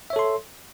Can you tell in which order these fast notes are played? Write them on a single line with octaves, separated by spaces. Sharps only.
E5 C#5 A4 C6